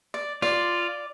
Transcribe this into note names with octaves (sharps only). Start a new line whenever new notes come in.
D5
F4 D5